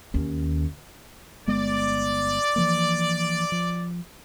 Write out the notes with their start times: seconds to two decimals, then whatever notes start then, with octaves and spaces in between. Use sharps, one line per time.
0.14 D#2 C#4
1.47 G1 G#3 B3 D5
2.56 E3 F3 A#3
3.52 F3